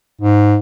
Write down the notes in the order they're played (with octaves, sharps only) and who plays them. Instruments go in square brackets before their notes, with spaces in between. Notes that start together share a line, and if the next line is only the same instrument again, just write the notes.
[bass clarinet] G#2